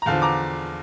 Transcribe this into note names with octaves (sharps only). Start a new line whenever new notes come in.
A#5
E2 D3 F3 F5 A5
A#5 D6